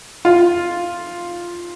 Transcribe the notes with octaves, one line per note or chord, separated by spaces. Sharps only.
F4